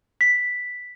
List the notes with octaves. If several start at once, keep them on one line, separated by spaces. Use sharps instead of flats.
B6